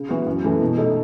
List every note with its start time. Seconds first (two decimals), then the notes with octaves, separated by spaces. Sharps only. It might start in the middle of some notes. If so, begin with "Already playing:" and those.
Already playing: C#3
0.09 E3 B3 F#4
0.26 F#2
0.44 E3 A3 C#4
0.61 B2
0.78 A3 D#4 A4